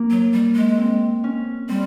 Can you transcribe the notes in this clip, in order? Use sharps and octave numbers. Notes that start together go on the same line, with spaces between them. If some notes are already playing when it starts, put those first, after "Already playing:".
Already playing: A#3
F#3
G3
G#3
C4
C#4
G3 C4